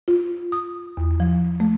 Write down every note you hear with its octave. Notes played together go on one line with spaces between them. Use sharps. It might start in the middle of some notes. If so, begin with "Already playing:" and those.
F4
D#6
E2
F3
A3